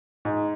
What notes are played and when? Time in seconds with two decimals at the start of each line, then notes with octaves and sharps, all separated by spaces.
0.25 G#2